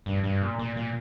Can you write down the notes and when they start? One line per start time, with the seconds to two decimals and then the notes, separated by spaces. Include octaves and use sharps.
0.06 G2
0.24 G2
0.42 A#2
0.59 A#2
0.77 A#2